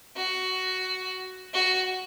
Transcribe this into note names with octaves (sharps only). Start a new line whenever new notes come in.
F#4
F#4